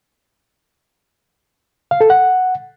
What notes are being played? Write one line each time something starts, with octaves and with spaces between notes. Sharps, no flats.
F5
A4
F#5